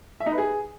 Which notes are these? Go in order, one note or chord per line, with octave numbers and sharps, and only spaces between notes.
E5
D#4
B4
G#4